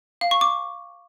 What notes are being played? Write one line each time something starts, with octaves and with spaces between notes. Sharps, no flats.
F5
C#6
D6